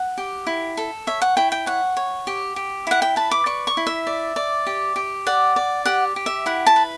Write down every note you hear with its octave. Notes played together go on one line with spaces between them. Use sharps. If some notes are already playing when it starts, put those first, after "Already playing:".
Already playing: F#5
G4
E4
A4
C#5 E5
F#5
E4 G5
G5
C#5 F#5
C#5
G4
G4
E4 F#5
G5
B4 A5
D6
D5 C#6
C#6
E4
E5
D5
D5
G4
G4
D5 F#5
D5
G4 F#5
G4
E5
E4 F#5
A5
B4